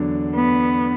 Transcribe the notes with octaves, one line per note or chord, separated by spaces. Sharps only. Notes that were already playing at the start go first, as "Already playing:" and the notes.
Already playing: E2 D3 F#3 D4
B3